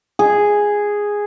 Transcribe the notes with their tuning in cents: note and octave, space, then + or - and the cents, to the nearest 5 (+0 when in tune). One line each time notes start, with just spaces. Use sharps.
G#4 -5